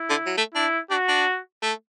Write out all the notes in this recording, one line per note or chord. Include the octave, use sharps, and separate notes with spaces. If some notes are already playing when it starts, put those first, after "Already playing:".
Already playing: E4
D3
F#3
A3
D4 E4
D4 F#4
D4
A3